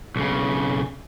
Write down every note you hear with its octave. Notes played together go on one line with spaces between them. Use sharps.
B1 C#3